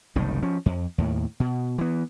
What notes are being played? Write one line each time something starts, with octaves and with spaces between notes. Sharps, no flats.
F#1 C2 A2 D#3
F3 C#4
F2
D#2 A2
B2
E3 B3